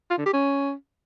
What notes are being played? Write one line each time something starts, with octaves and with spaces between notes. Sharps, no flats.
F4
D3
G4
C#4